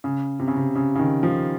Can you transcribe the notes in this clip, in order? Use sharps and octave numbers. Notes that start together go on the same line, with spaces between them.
C#3
C3
C#3
C3
C#3
C#3
D#3
F3